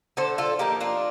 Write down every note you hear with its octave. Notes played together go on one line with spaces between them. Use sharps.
D3 A4 C5
F4 A4
F3 A#3 D#4 G4
D4 F4